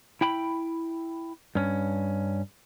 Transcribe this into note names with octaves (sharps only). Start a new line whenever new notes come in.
E4 G5 B5
G2 C#4